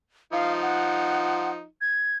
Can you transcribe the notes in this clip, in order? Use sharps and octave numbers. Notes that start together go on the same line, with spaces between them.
F3 D#4 F5
F#5
G#6